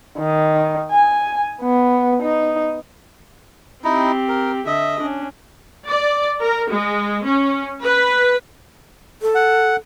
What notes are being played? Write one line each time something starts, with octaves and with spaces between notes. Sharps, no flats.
D#3
G#5
B3
D#4
C4 D#4 E4 G4
A#4
D3 D#5 E5
C#4 D4
D5
A#4
G#3
C#4
B4
A4
F#5